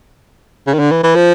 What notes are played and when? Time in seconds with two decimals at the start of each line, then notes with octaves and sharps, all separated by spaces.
0.67 C#3
0.74 D#3
0.79 D3
0.91 E3
1.03 E3
1.15 F3